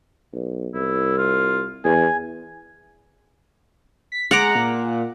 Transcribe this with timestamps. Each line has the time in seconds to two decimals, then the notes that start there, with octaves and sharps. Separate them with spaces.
0.33 B1
0.74 C2 E4
1.18 F4
1.84 E2 G#5
4.12 B6
4.31 G#3 F#5 A#5 D6
4.55 A#2